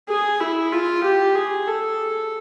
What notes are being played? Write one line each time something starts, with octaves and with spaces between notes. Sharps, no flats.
G#4
E4
F4
G4
G#4
A4